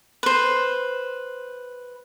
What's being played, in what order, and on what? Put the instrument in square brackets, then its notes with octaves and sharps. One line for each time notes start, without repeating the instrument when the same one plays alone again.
[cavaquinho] B4 C5